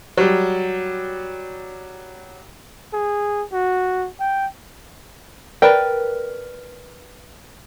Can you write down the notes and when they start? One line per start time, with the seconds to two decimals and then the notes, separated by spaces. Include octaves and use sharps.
0.17 F#3 G3
2.93 G#4
3.53 F#4
4.20 G5
5.62 A#4 B4 D5 G5